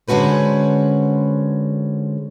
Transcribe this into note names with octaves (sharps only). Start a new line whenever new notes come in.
D3 G#3 C#4 F#4 B4 C5